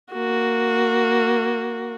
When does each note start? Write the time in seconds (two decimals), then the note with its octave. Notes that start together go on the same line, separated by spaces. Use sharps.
0.13 A#3 F#4